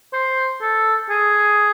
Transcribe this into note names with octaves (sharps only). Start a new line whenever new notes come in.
C5
A4
G#4